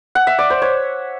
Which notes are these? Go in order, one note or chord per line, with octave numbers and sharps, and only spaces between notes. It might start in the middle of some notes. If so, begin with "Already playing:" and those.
F#5
E5
D5
C5
C#5